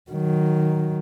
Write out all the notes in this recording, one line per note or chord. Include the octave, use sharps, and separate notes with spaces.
D#3 F#3